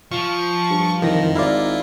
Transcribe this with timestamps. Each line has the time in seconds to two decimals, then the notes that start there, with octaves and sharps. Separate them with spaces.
0.12 F3 C#6
0.70 G2
1.02 C2 F2 D#3 E3 A#6
1.35 G#1 E4 F4 D5 F5 A#5